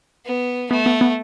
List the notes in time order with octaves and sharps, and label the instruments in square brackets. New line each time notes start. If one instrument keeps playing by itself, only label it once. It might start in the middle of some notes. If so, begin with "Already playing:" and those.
[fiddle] B3
[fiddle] A3 [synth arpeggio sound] B3
[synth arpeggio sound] B3
B3